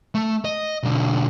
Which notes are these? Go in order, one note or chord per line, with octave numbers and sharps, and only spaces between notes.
A3
D#5
B1 D3